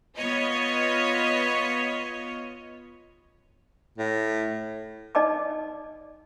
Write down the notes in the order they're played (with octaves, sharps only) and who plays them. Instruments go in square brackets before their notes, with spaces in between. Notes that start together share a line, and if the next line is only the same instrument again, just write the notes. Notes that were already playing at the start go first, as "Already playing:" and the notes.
[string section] B3 F4 C#5 D#5
[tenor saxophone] A2
[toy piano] D#4 D5 D#5 A5 D6